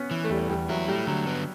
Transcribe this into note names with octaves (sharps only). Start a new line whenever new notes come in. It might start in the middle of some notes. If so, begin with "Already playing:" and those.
Already playing: B3 C#4
E3
A3
E2 G3
E2 G3
F#3 E4
G3 A3
D3 F#3
B3